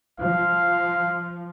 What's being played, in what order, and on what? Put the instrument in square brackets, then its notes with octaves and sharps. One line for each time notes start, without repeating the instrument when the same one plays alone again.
[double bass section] F3 [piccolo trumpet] F5